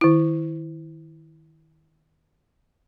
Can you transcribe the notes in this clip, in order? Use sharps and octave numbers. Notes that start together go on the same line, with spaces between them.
D#3 E4